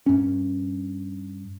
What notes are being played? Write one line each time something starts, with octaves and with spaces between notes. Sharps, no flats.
G2 C#4